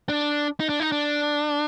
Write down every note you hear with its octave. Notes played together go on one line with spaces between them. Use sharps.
D4
D#4
D4
D#4
D4